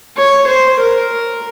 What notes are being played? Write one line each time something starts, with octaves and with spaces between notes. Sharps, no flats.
C#5
C5
A#4